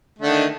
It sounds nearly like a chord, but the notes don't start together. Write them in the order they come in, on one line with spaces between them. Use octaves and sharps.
A3 D3 D#3